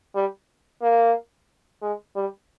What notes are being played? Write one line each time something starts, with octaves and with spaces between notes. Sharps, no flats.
G3
A#3
G#3
G3